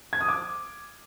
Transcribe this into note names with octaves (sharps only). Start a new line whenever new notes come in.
G#6
D#6
D6